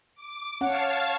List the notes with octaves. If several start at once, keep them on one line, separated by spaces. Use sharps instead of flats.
D6
C#4 C#5 F5 F#5 A5